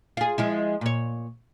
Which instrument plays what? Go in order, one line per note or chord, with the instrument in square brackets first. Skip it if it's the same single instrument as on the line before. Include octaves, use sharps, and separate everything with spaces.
[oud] F4 G#4
F3 G#3 E4
A#2 C#5